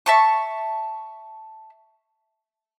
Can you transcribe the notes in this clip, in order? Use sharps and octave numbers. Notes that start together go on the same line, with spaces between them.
E5 A5 C#6